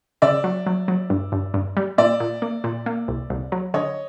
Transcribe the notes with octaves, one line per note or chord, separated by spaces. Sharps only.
C#3 D5 E5
F#3
F#3
F#3
G2
G2
G2
G3
A#2 D5 E5
A#2
A#3
A#2
A#3
C2
C2
F#3
D3 C#5 D#5